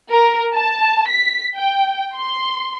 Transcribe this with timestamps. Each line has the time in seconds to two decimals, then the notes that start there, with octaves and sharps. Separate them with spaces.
0.11 A#4
0.54 A5
1.09 B6
1.55 G5
2.15 C6